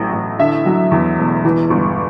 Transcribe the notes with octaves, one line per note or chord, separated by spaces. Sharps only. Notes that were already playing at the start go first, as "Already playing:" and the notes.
Already playing: A1 A2 F#3
A1
D3 E5
F#3
E2
E1
E3
G1